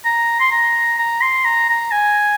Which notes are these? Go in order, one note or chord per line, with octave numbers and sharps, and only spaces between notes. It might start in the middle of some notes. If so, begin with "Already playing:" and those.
A#5
C6
A#5
A#5
C6
A#5
A#5
G#5